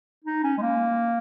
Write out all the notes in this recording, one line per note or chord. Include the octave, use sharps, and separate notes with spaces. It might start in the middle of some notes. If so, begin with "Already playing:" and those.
D#4
C#4
G#3
A#3